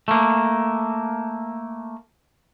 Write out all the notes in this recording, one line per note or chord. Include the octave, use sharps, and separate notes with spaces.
A3 A#3